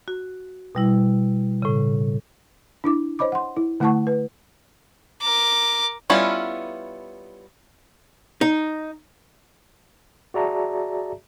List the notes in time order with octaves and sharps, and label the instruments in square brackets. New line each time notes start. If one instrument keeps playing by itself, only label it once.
[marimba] F#4
B2 G3 E4
A2 C#3
[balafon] D4 E4 D6
C5 C#5 D#5 B5 D6
F#5 C6
E4
D3 A3 E4 F#5 A5 C#6
B4
[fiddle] A#4 D6
[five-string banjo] G3 B3 C#4 E4 F4
[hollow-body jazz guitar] D#4
[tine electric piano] F#4 G#4 D5 E5 A5 A#5